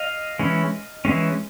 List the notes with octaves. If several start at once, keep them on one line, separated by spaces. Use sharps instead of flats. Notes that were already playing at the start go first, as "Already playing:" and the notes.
Already playing: D#5 F5
E3 G#3 C#4
E3 G#3 C#4